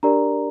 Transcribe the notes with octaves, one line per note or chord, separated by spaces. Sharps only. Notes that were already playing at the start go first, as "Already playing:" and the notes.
D4 G4 A#4 D5 A#5